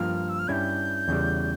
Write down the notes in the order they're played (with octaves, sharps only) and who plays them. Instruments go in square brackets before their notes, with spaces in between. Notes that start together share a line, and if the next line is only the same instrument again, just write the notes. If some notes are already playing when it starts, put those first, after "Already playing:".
Already playing: [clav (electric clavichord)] G2 F3 A#3 F4 A#4 [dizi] F6
[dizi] E6
F6
[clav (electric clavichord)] G2 G3 C#4 E4 [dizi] G6 G#6
[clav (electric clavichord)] E2 C#3 G3